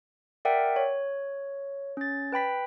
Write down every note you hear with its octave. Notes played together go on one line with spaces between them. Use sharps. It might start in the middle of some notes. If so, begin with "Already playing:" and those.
A#4 D5 E5 F#5 G5
C#5
C#4 A6
B4 G5 B5 B6